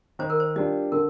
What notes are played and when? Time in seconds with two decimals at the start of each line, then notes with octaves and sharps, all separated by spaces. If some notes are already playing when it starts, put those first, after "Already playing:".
0.19 D#3 C5
0.30 A#4
0.40 C5
0.56 G3 D4 F4 D#5
0.92 D3 A#4